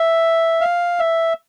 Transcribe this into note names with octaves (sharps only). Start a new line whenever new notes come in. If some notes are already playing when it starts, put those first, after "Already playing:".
Already playing: E5
F5
E5